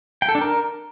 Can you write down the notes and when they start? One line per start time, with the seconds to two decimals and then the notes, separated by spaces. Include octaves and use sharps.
0.22 G5
0.29 A4
0.35 D4
0.41 A#4